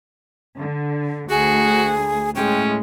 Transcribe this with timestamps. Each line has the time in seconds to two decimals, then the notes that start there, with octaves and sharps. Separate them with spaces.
0.57 D3
1.30 D2 F#4 G#4
2.36 A2 G#3 C#4 G5